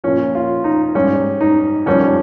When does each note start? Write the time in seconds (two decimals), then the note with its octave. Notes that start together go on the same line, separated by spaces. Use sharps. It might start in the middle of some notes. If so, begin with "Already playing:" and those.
0.04 A#2 F3 C#4
0.35 F4
0.64 D#4
0.95 G#2 G3 C#4
1.41 D#4
1.86 F2 D#3 G3 C#4